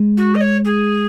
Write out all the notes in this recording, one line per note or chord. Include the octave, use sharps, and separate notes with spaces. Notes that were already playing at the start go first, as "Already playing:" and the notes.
Already playing: G#3
F#4
D#5
C#5
G#4